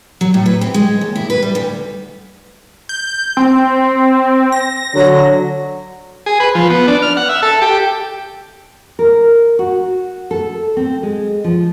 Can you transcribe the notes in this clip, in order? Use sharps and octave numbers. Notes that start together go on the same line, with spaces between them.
F#3
A2
B4
C4
G#3
D#2
E4
B4
G3
D2
G6
C4
A#6
D3 F#3
G#4
B4
F3
B3
D4
F6
F#5
E5
A4
G4
A#4
F#4
A4
C4
G#3
F3